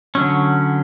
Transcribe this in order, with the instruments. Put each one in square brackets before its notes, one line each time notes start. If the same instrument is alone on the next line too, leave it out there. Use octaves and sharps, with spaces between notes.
[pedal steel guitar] D3 F#3 C#4